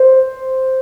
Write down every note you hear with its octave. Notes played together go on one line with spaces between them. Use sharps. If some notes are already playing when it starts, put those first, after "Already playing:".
Already playing: C5